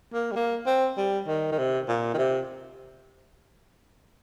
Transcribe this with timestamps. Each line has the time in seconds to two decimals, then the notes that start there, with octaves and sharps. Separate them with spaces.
0.14 A#3
0.32 G3
0.36 A#3
0.66 C4
0.97 G3
1.27 D#3
1.52 D#3
1.58 C3
1.88 A#2
2.14 D#3
2.18 C3